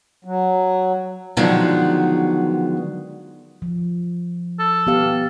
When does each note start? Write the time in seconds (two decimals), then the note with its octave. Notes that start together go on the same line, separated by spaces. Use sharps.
0.25 F#3
1.37 D3 D#3 F3 F#3 G#3 B3
3.62 F3
4.60 A4
4.87 B3 G4 F5